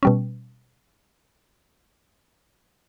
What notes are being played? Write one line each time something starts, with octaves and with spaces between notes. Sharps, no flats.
B2 G3 C#4